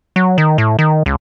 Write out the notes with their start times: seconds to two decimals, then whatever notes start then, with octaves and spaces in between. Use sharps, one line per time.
0.16 F#3
0.38 D#3
0.58 A2
0.79 D#3
1.06 C#2